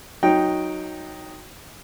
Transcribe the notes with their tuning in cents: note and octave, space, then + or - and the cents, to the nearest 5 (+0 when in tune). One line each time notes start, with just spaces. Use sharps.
F#3 -10 D#4 +0 G5 +0